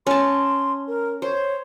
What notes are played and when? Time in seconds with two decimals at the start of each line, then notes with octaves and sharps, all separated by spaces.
0.07 C#4 A5 C6
0.88 A#4
1.22 C5 C#5